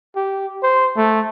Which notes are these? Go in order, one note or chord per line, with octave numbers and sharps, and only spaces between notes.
G4
C5
A3